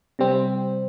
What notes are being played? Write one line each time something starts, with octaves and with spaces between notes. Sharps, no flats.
C3 G3 C4